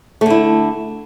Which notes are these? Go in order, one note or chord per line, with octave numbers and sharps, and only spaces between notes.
D3 A3 E4